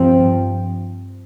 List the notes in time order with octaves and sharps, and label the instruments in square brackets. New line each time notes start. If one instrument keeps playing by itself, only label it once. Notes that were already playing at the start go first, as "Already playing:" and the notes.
Already playing: [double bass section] G2 F3 C4